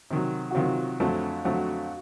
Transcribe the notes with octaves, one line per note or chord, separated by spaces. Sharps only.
C3 D#3 F#3
F#4
C3 D#3 F#3 F4
F2 D3 F#3 A3 C4
F2 D3 F#3 A3 C4 F#4